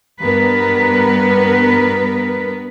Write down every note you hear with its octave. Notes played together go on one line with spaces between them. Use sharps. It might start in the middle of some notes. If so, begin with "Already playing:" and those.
G2 B3 A#4 B4